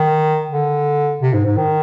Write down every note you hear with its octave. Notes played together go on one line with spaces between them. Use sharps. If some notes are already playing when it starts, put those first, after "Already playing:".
Already playing: D#3
D3
C3
G#2
G#2
D#3